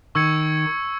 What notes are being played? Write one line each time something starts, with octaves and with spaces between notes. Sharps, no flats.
D#3 C#6 E6 G#6 C#7